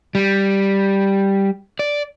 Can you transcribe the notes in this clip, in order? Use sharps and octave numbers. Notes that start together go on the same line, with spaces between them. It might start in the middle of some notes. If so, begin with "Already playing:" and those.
G3
D5